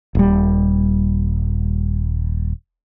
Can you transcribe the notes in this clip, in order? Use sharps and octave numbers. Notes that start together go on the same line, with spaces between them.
D#1 G3